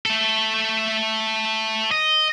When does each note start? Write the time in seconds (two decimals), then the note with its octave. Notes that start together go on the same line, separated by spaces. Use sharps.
0.06 A3 A4
1.91 D#5